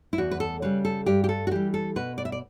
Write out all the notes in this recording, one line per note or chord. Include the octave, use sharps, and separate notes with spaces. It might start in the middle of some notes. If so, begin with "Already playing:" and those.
E4
E2 F#4
B4
A4
C#3 G3 B4
A4
G2 G4
G4
A4
F#4
E3 G3 G4
A4
B2 B4
D5
E5
D5